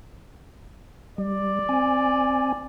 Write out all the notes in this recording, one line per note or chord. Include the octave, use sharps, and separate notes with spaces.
G3 D5
C4 G#5